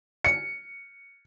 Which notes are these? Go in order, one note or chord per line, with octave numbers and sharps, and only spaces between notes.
C#7